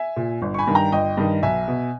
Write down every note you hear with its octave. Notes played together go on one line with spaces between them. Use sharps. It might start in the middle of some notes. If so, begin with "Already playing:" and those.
Already playing: E5 G#5
A#2
G1
C#6
G#5 B5
G2 D#3
G5 A#5
G1 D#5 G5
G2 D#3
B1 E5 G#5
B2